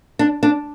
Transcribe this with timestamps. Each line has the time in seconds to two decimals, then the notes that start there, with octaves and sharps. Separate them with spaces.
0.19 D4
0.43 D4